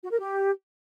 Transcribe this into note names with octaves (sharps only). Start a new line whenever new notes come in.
F#4
A#4
G4